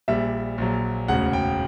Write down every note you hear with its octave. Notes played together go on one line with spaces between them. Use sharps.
A#1 A#2 G3 E5
A#1 A#2 F#3
E1 D2 C#3 F#5
G5